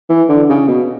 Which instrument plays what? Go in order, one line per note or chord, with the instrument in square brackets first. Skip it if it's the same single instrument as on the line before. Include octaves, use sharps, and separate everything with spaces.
[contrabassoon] E3
D3
C#3
B2